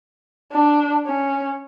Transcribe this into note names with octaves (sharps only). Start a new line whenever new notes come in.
D4
C#4